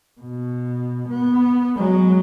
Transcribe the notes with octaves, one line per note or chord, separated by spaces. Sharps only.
B2
B3
F#3 G#3